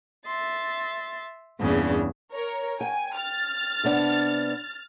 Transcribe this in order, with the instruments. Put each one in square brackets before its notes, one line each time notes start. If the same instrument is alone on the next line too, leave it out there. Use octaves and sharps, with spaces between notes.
[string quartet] E5 C6 A6
E2 G2 A#2 C#3 C#4 D4
[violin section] A#4 C#5
[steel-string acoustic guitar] G5 [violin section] G#5
[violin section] F6 A6
[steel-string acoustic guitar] C3 B3 D4